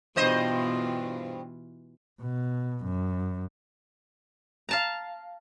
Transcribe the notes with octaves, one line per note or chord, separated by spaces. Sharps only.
G2 B2 E3 F4 C5 D#5
B2
F#2
F5 A5 A#5